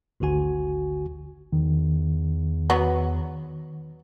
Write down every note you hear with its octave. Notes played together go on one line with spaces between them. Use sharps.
G#1 D2 D3 F#4 G#5
E2 D#3
F#3 B3 B4